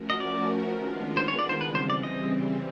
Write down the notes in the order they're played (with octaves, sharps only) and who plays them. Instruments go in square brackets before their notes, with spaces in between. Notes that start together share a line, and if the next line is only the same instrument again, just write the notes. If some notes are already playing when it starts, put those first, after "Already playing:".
Already playing: [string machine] F3 A3 C#4 F#4 A#4
[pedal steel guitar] D#5
D5
[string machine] D#3 G#3 B3 D4 F4
[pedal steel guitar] C5
C#5
D5
C5
[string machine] C#3 E3 G3 C4 [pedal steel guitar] B4
[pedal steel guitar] C5
D5
D#5